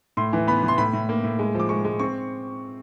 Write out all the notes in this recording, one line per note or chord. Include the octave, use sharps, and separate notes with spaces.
A2 C6
E3
B3 B5
E3
C6
A2 B5
A2
A#3
A2
G#3
F3
D6
G#3 C#6
G#3
C4 C#6